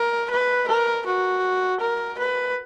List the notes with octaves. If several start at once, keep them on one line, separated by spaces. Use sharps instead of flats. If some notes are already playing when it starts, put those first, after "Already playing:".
Already playing: A#4
B4
A#4
F#4
A#4
B4